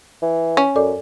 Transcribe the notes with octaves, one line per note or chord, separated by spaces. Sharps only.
E3
C#4
F#2 A4 D5 D6